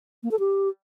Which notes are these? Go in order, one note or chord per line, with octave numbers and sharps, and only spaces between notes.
A#3
A4
G4